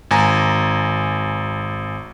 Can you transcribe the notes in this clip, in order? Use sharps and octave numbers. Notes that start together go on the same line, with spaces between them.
G#1 G#5 A#5